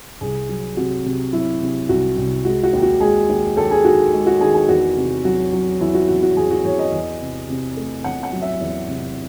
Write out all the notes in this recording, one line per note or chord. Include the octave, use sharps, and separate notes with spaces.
C2 G#4
F#3
C3 F#4
C3
F#3 E4
C3
C2 F#4
C2
G#3 F#4
F#4
D#2
F#4
G#3 G#4
D#2
D#2 A4
G#4
D#3 F#4
G#3
F#4
D#3 G#4
G#4
E2 F#4
C3
F#3 F#4
F#3
E2 E4
F#4
E2 F#4
F#4
E2 G#4
F#4
E2 C#5
D#5
E2
C3
C3
A3
E2 F#5
F#5
F#3
E5
E2
C3